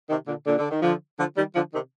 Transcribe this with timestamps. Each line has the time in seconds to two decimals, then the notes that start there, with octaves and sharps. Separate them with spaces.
0.10 C3 D#3
0.28 A#2 D3
0.46 A#2 D3
0.59 D3
0.71 D#3
0.82 D3 F3
1.19 D3 F3
1.37 D#3 G3
1.55 D3 F3
1.73 C3 D#3